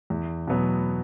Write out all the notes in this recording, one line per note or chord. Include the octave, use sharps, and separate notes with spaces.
E2
B2 F#3 B3